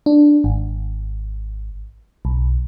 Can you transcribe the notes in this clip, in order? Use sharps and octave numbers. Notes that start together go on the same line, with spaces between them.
D4
G#1
B1